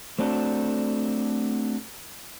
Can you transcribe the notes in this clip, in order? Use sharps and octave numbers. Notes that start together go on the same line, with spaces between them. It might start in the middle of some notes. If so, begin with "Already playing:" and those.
A3 C4 D4 F#4 G4 A4